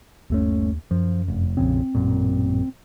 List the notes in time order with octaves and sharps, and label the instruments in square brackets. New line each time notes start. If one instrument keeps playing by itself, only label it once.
[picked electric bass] G1 A3 C#4 [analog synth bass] D#2
[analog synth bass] F#2 [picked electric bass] F3
[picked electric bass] F1
[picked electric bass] A#1 F2 C#3 [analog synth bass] C4
[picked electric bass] A1 F#2 A#2